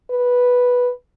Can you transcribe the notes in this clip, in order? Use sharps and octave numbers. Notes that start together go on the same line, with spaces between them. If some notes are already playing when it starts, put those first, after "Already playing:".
B4